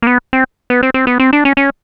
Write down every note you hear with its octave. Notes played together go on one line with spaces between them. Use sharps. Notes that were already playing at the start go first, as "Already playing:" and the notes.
A#3
B3
C4
B3
C4
C4
B3
C4
D4
C#4
C#4